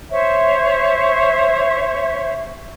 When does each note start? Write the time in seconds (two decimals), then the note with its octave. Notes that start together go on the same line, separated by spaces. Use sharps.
0.10 C5 C#5 E5